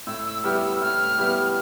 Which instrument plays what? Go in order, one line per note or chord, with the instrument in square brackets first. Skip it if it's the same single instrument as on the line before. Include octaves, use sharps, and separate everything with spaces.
[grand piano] A2 [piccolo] E6
[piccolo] E6
[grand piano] G3 B3 E4 G4 [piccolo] F6
[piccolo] E6
[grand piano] A2 [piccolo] F6
[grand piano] G3 B3 E4 G4